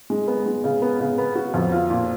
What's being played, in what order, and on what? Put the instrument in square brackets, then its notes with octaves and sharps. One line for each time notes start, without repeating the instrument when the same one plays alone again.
[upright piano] G#3
B3
G#3
C#3
B3
C#3
B3
F#4
F2
F4
A#2